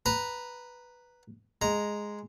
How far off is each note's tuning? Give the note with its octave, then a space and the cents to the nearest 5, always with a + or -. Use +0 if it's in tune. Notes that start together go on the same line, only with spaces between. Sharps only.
B4 +0 A#5 +0
G#3 +0 A#5 +0